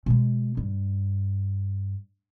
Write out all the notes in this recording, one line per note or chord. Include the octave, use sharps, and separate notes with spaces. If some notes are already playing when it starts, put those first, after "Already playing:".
B2 G#3
G2